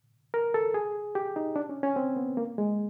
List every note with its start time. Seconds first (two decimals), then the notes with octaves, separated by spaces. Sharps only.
0.34 A#4
0.54 A4
0.74 G#4
1.15 G4
1.36 D#4
1.56 D4
1.69 C#4
1.83 C#4
1.96 C4
2.17 B3
2.37 A#3
2.58 G#3